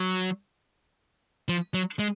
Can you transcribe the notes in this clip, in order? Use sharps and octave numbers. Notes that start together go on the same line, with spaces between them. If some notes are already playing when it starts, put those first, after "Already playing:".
Already playing: F#3
F3
F#3
G#3